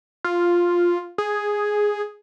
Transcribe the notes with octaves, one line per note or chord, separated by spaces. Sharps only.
F4
G#4